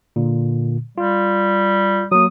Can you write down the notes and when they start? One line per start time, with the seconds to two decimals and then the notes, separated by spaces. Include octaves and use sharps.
0.16 A#2 D3
0.98 G3 F4
2.12 F#3 A#3 D#6